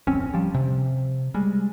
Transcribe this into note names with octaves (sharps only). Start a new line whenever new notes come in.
D1 F2 C4 C#4
F3 G3
C3
G3 G#3